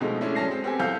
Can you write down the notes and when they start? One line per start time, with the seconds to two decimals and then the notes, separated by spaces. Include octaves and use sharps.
0.01 B2 D3 F3 G#3 A3 D#4
0.21 G#3 A3 C#4 D4 E4
0.35 F#3 C#4 A5 A#6 C7
0.47 G#3 C4
0.63 B3 C4 G4 A4 G#5
0.80 C2 A4 F5 G6